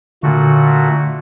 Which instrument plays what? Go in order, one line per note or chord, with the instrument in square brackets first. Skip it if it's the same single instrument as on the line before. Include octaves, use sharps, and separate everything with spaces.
[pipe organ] A#2 A3 F#4 [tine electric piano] D3